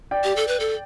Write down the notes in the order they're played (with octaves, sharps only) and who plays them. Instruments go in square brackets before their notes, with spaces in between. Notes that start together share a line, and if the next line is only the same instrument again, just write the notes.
[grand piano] D5 G5
[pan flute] G4
A4
B4
A4